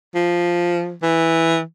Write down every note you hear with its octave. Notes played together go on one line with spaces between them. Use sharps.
F3
E3